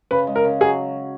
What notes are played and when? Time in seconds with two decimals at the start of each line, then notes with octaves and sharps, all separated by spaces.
0.11 C#3 B4
0.27 G#3
0.36 A#4
0.45 C#3
0.61 F#3 G#4